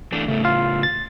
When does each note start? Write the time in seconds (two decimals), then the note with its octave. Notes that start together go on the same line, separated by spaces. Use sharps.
0.12 E3 A3 D4
0.28 A2 C#3 A3
0.45 F4 F5
0.83 A6